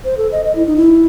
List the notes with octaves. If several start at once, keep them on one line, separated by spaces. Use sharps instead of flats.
C5
A4
D#5
D#5
E4
D#4
E4